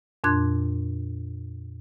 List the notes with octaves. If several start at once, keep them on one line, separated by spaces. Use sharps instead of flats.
F2 A#2 D4 C6 F#6 G#6